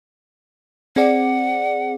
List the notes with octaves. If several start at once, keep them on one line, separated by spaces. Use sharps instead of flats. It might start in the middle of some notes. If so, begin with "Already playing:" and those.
C4 G#4 D5 F#5